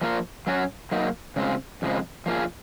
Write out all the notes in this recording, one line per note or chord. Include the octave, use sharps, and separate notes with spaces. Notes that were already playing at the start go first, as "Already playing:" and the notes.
F3 A#3 F4 A#4
F#3 C#4 F#4
F#3 A#3 D#4
C#3 G#3 C4 F4
F2 C#3 F3 G#3
F3 A#3 F4 G#4